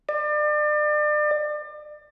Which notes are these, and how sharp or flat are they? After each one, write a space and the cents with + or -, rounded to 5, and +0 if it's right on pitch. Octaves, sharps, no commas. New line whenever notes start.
D5 +35